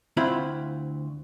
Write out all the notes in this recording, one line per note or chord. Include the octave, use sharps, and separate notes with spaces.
D2 C4 E4 F4 B5